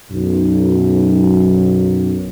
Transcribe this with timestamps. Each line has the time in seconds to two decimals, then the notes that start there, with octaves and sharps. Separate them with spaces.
0.11 B1 F#2